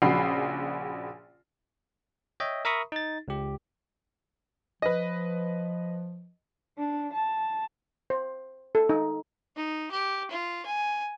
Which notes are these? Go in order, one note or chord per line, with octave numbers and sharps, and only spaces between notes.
A#1 C#3 F#4 B5 C7
C#5 D#5 E5 G5
A#4 E5 A#5 B5 C#6 D#6
D#4 A6
C#2 G4
F3 B4 D#5
D4
A5
C5
A4
D#4
D#4
G4
F4
G#5